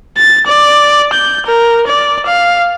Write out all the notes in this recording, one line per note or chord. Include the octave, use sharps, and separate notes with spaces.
A6
D5
G6
A#4
D5
F5